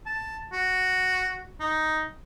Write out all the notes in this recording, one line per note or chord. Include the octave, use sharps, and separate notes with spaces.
A5
F#4
D#4